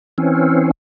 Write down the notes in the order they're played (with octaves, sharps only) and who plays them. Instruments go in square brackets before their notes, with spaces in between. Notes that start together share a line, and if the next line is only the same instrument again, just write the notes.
[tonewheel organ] E3 C4 C#4